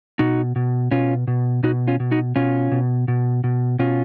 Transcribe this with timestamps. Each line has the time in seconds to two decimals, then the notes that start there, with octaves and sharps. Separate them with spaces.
0.19 B2 D#4 F#4
0.56 B2
0.91 B2 C#4 F4
1.27 B2
1.63 B2 D#4 F#4
1.88 C#4 F4
2.00 B2
2.11 D#4 F#4
2.36 B2 C#4 F4
2.72 B2
3.08 B2
3.44 B2
3.79 B2 C#4 F4